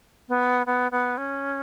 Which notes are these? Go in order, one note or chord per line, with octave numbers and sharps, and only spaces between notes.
B3
B3
B3
C#4